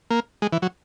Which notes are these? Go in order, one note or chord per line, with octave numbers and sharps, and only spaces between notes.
A#3
G#3
E3
F#3